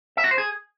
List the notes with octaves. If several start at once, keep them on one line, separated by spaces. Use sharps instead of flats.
E5
F#4
C5
G#4